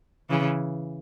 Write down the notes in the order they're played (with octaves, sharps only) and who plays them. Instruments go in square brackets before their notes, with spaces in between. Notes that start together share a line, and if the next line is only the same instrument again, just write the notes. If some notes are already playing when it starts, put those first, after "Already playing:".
[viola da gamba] C#3 E3